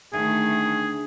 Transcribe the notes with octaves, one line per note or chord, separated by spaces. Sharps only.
D2 D#3 A3 G#4